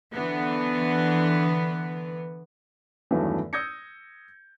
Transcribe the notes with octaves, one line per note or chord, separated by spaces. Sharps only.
D3 E3 B3
E2 G2 D#3 F#3 A3 B3
D#6 E6 G6 G#6 A#6 C#7